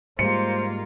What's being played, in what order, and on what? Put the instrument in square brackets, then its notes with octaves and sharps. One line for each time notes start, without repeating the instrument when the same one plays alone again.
[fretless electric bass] G#2 G3 G#3 [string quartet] A#3 F4 [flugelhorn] C5 [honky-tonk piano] C#7